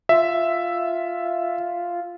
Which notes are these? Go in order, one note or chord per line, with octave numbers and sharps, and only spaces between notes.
F4 E5